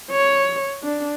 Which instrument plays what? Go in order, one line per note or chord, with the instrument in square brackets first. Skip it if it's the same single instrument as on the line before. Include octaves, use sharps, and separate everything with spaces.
[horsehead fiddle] C#5
D4